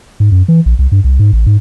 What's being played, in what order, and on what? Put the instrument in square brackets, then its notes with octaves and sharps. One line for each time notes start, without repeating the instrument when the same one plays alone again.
[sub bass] G#2
F#2
E3
A#1
C2
G2
C2
G#2
A1
G#2